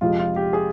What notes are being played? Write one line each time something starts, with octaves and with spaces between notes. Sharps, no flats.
F2 C3 F3 G#3 F4
F4
G4
G#4